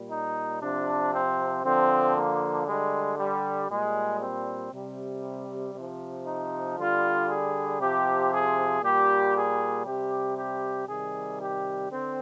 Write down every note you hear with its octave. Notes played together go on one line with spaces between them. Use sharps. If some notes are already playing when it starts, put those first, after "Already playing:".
Already playing: A#2 G3
D#4
C3 F3 D4
C4
D3 F3 C4
A#3
D3 G3 G#3
G3
A#2 G3 G#3
C4
C3 G3
C3 F3
D#4
D3 G3 F4
G#4
C3 F3 G4
G#4
A#2 G3 G4
G#4
C3 G3 G4
G4
C3 D#3 G3 G#4
G4
D3 C4